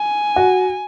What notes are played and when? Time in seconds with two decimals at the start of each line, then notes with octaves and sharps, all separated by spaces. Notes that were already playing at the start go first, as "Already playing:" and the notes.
Already playing: G#5
0.36 F#4